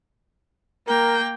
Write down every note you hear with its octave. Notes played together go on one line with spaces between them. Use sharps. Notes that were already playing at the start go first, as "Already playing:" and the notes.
A#3 A#4 G5